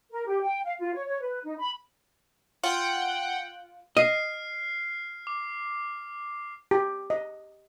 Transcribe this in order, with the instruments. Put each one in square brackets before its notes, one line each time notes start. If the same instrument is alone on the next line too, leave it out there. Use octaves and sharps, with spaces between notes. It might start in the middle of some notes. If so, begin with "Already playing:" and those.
[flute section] A#4
G4
G5
F5
F4
C#5
C#5
B4
D#4
B5
[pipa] F4 [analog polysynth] F#5 G5
[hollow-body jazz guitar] D#5 [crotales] F6 C7
[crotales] D6
[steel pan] G4
D#5